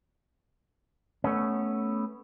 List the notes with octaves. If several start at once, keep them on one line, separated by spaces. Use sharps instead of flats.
A3 B3 C#4